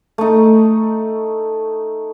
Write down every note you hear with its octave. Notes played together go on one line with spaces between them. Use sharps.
A3 D#4